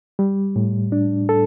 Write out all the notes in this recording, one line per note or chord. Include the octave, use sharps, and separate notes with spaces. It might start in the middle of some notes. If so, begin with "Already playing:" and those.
G3
A2
D4
A4